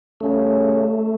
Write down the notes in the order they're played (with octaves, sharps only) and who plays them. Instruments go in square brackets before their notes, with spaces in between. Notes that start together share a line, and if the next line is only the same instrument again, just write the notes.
[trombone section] C#3 G3 C#4 [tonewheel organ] A3